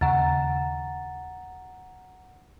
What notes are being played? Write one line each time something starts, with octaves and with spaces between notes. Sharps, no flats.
D#2 C#3 F#5 A#5 A6